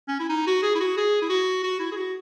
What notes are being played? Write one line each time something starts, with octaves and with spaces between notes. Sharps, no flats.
C#4
E4
D#4
F#4
G#4
E4
F#4
G#4
E4
F#4
F#4
E4
G#4
F#4